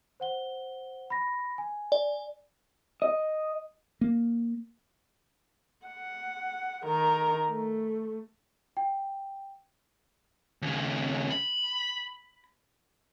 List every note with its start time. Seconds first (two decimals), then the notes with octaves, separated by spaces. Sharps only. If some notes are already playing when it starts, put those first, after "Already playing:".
0.20 C5 F#5 G7
1.10 B5 A#6
1.58 G#5
1.92 D5
3.02 D#5
4.01 A#3
5.87 F#5
6.85 D#3 A#4
7.48 A3
8.77 G5
10.62 D#2 C#3
11.30 B5